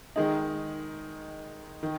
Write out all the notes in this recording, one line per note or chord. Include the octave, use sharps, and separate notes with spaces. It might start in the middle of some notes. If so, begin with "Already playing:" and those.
D#3 G#3 D#4
D#3